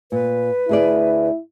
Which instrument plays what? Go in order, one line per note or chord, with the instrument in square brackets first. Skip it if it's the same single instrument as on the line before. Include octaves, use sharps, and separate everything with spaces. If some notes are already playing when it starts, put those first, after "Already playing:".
[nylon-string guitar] A#2 [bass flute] B4
[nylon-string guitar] D2 G#4 D5 [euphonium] E4